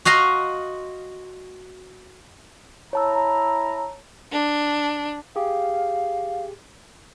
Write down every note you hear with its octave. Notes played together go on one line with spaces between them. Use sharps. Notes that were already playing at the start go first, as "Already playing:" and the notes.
F#4 D#5 F5 A#5 C6
E4 C#5 A5 A#5 E6
D4
G4 G#4 F5